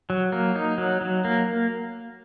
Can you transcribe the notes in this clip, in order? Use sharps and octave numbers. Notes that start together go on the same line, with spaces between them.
F#3
A#3
D#4
F#3
F#3
A#3